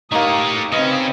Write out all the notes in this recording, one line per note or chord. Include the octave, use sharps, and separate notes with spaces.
A3 A#3 D#4 G4 C#5 D#6
C#3 C4 C#4 B4 D#5